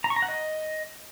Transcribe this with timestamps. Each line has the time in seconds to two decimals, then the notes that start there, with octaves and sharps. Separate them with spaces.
0.04 A#5
0.10 C#6
0.16 A#5
0.22 F#5
0.28 D#5